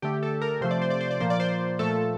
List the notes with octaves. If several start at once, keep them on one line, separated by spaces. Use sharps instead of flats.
D3 A3 G4
A4
A#4
C3 F3 A3 C5
D5
C5
D5
C5
D5
A#2 F3 A#3 C5
D5
C5
A#2 F3 A3 A4